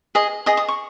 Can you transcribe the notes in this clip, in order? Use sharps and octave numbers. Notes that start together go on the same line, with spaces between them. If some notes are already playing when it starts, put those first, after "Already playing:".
G#4 D#5
G#4 D#5 D#6
D#6
C#6